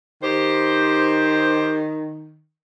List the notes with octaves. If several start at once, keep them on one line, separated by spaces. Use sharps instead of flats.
D#3 G4 C5